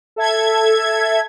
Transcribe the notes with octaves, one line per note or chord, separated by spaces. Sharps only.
A4 E5 G#6